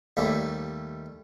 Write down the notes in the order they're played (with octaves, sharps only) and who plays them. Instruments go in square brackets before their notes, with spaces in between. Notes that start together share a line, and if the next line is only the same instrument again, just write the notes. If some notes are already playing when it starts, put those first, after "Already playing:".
[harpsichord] D#2 G3 A3